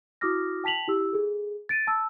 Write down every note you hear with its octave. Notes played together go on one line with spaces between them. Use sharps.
E4 F#4 D6 D#6 F6 A#6
G5 A5 B6 F7 F#7
E4 G4 E6
G#4 A4
A6 D7 D#7
A5 E6